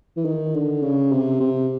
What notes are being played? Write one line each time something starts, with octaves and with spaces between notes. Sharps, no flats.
E3
D#3
D3
C#3
C3
C3